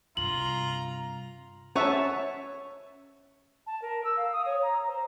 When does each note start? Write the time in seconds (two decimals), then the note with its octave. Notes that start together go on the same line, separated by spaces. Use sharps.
0.17 G2 C3 F4 A#5 F#7
1.76 C#4 C#5 E5 F#5 G#5 A5
3.67 A5
3.82 A#4
4.04 E6
4.17 F5
4.33 D#6
4.46 C#5
4.62 A#5
4.87 C5